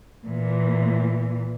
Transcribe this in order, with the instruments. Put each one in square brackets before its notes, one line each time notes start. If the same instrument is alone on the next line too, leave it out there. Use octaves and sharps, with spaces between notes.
[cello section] A#2 E3